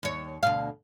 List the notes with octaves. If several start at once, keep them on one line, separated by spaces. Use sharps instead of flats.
D#2 C#5
D2 B2 F5